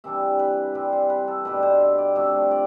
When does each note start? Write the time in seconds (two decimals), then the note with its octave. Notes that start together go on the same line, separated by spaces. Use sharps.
0.04 C3 E3 G3 D4 E5
0.39 B4
0.74 C3 G3 C4 B4
0.92 C5
1.10 B4
1.28 A4
1.45 B2 G3 D4 B4
1.63 C5
1.81 E5
1.98 D5
2.15 C3 F3 A3 D4 E5
2.51 D5